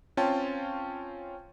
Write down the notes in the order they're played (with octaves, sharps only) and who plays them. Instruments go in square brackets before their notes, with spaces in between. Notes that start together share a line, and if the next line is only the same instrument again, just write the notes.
[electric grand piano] C4 C#4 F4 G5 A5